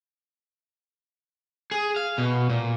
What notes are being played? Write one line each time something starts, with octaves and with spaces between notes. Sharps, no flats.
G#4
F5
B2
A#2